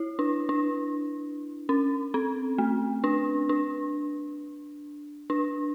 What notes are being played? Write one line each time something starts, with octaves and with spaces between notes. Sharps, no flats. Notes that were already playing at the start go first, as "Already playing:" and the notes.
Already playing: E4
D4
D4
C#4
C4
A3
D4
D4
D4